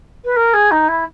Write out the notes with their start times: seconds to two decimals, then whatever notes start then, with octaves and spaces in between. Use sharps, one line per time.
0.24 B4
0.36 A#4
0.53 G#4
0.71 D#4
0.88 E4